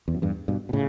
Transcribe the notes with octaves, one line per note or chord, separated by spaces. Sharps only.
E2
F#2
E2 G2
G2 B2
B2
A2 C#3